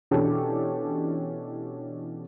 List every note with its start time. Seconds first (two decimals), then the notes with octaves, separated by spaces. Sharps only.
0.11 B2 E3 C#4 D4 G4 A4